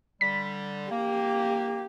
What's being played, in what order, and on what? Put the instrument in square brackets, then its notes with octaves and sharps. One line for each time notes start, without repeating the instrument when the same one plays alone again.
[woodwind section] D3 G3 [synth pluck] B6
[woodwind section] A#3 [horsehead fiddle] G4